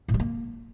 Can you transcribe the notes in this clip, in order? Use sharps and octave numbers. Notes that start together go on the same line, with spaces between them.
A2
G3
A#3